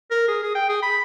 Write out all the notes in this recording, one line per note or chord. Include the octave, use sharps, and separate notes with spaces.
A#4
G#4
G#4
G5
G#4
B5